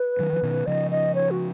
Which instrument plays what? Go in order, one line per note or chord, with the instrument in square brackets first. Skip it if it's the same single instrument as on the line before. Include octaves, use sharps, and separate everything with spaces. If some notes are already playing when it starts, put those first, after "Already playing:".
Already playing: [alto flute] B4
[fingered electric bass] D#3 F#3
F3
B2 D#3
[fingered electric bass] C#3 F3 [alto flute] D#5
[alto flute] D#5
C#5
F#4